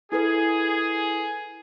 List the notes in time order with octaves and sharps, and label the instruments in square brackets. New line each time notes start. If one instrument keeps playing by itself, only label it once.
[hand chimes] E4 A4 B4 [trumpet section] G#4